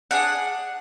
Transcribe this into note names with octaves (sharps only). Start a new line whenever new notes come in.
D4 G#4 F#5